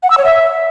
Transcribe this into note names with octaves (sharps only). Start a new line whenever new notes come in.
F#5
E6
C#5
E5